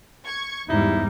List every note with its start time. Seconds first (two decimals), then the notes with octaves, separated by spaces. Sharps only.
0.24 C#6 G#6
0.69 E2 G#2 G3 D#4 E4